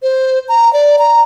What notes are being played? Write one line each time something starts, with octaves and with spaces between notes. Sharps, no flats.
C5
A#5
D5
A#5